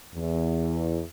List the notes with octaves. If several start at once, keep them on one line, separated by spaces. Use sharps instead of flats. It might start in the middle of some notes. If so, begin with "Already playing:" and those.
E2